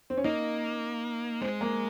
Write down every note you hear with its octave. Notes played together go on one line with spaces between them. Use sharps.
C4
C#4
A#3 D#4
G#3 C4
A#3